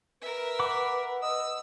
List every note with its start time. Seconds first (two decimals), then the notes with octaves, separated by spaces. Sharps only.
0.21 A#4 B4 E5
0.59 F#5 B5 D6
1.22 D#5 E6